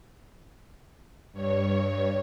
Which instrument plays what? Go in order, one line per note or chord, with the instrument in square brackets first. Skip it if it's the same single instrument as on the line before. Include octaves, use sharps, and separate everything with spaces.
[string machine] G2 C#5